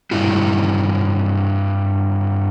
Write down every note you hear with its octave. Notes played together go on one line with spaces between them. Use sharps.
G2 E4 F4